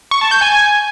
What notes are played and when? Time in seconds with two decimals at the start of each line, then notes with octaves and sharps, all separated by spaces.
0.11 C#6
0.21 A5
0.31 G6
0.41 G#5